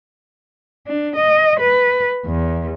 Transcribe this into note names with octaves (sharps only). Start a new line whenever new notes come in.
D4
D#5
B4
E2